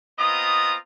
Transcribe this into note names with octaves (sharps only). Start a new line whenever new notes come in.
B3 C4 F4 D#5 A#5 D#6